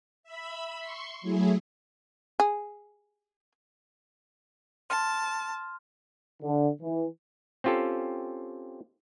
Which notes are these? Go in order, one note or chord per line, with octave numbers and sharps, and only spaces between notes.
E5 B5
C6 C#6
F#3 A3 E4 G#4
G#4
A5 C6 F6
D3
E3
C4 C#4 F4 G4 A4